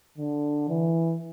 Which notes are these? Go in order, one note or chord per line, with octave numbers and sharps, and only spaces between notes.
D3
E3